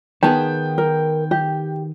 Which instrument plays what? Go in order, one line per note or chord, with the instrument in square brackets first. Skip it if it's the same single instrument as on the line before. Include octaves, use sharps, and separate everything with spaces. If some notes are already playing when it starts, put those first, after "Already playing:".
[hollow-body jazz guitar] D#3 B3 G#4 [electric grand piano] G5 [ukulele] A5
[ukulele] A#4
G4